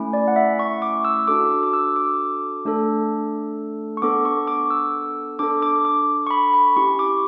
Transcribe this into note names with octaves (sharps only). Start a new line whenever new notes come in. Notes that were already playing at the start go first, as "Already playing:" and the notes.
Already playing: A3 C#4 E4
D5
F#5
E5
C#6
D6
E6
D4 F#4 A4 D6
D6
D6
E6
D6
A3 D4 A4
C#6
B3 D4 A4 D6
C#6
D6
E6
D4 A4 D6
D6
D6
C#6
B5
B5
C#4 E4 G4 C#6
D6